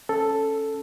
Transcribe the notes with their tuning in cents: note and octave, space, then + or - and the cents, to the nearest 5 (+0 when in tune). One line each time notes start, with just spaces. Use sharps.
C#4 +0 A4 +0